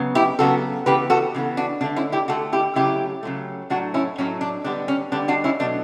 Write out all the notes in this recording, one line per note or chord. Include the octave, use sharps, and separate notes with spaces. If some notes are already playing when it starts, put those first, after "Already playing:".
Already playing: C#3 F#3 B3
E4 G4
C#3 F#3 B3 F#4 A4
C#3 E3 B3 G4 B4
F#4 A4
C#3 E3 B3
D4 F#4
D3 A3 D4
C#4 E4
E4 G4
D3 A3 F#4 A4
E4 G4
C#3 F#3 A3 E4 G4
C#3 F#3 A3
A2 F#3 A3 D4 F#4
C#4 E4
A2 F#3 A3 C#4
D4
D3 G3 B3 D4
C#4
D3 G3 B3 D4
D4 F#4
C#4 E4
B2 F#3 A3 D4